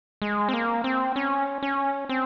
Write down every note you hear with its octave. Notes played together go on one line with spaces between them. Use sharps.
G#3
C4
A#3
C4
C#4
C#4
C4